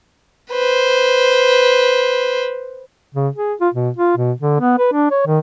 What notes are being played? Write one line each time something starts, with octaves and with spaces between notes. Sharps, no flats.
B4 C5
C#3
G#4
F4
B2
F4
B2
D3
B3
B4
D4
C#5
D#3